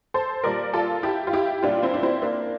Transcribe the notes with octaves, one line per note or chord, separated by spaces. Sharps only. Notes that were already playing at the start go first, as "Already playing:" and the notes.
A4 C5
A#2 G3 A#4 D5
F4 A4
E4 G4
F4
E4 G4
A#2 G3 D4 F4
C4 E4
D4
C4 E4
A#3 D4